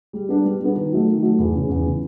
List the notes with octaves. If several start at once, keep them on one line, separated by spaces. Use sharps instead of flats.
G3
B3 D4
G3
B3 D4
D#3
F#3 A3
D#3
F#3 A3
E2
C#3 E3
E2
C#3 E3